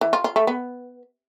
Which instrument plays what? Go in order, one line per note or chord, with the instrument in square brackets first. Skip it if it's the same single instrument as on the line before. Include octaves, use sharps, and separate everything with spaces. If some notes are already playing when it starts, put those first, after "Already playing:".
[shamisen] E3
F4
F4
A3
B3